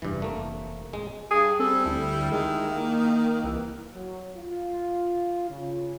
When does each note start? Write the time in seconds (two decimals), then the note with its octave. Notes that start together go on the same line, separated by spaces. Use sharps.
0.02 F1 E2 G2 E3
0.22 A3 A#3
0.93 F2 A2 G#3
1.31 G2 G#4
1.60 G3 C4 A4
1.86 D2 E4
2.32 D#3 G#3
2.67 A#3
3.44 C2 E3
3.94 F#3
4.35 F4
5.50 C#3